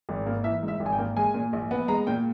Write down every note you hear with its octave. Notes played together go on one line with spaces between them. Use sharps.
G#1
A#3
E3 E5
G#2
E5
G#1
G#5
G5
A#3
G#3 G#5
A#2
A#1
B3
G#3 A#5
A#2 G5